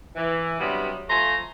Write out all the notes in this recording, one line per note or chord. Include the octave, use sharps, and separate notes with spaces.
E3
G2 C3 F#3 G3 B3
F3 A3 G#5 A#5 C6